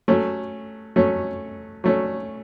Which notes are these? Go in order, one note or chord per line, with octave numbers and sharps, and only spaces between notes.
F#3 A3 C#4
F#3 A3 C#4
F#3 A3 C#4